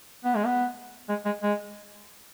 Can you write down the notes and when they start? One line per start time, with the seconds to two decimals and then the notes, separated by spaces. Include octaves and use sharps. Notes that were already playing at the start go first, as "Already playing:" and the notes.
0.25 B3
0.35 G#3
0.46 B3
1.09 G#3
1.25 G#3
1.43 G#3